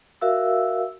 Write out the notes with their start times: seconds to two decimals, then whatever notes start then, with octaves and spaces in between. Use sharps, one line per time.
0.21 F#4 A#4 E5 F5 E6